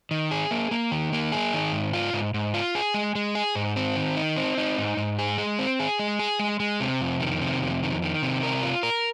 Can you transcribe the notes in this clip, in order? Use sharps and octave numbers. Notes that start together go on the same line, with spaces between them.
D#3
G#4
A#3
A#3
D#3
A#3
G#4
D#3
G#2
F4
G#2
G#2
F4
G#4
G#3
G#3
G#4
G#2
C4
D#3
D#4
C4
D#4
G#2
G#2
G#4
G#3
C4
G#4
G#3
G#4
G#3
G#3
C3
F2
D#3
C3
F2
D#3
D#3
C3
A#4
F4
A#4